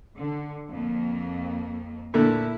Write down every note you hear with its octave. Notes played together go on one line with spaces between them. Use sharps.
D3
F2 A#3
A#2 D3 A3 E4